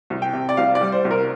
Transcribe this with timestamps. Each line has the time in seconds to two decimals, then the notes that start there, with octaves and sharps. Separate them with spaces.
0.10 C2
0.22 G5
0.33 C3
0.49 D5
0.57 C2 F5
0.75 D5
0.81 G3
0.92 C5
1.05 C2
1.11 A#4